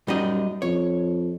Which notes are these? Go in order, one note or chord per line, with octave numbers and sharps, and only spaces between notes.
F#2 G3 D#4 D#5
F2 C#5